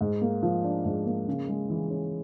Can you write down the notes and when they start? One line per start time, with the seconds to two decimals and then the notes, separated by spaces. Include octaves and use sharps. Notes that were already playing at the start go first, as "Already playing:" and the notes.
0.01 G#2
0.22 A#3
0.42 F3
0.64 D4
0.85 G#2
1.06 A#3
1.28 C#3
1.48 G#3
1.70 E3
1.90 C#4